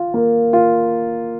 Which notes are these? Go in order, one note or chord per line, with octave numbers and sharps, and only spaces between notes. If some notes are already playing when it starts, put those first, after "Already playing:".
Already playing: F4
A#3
F4